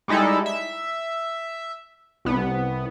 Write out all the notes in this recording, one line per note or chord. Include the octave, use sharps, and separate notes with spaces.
G3 G#3 D#4 E4 A4
E5
C2 B3